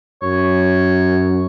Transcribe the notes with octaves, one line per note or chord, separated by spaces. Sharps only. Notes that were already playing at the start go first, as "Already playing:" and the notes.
F#2 C#5